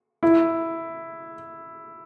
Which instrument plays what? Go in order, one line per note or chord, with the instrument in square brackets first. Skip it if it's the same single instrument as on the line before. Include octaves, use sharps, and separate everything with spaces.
[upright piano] E4